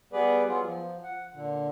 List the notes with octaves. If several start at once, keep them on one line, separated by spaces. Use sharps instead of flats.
G3 B3 G#4 B4 D5
F#3 B3 F4 G#4
F3
F#5
A#2 D3